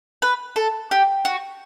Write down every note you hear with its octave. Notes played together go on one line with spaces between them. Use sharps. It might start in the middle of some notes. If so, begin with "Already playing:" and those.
B4
A4
G4
F#4